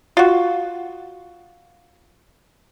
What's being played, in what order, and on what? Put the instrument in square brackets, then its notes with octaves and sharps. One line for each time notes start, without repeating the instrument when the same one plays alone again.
[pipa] F4 F#4